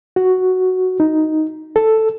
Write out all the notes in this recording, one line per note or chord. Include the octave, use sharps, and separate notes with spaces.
F#4
D#4
A4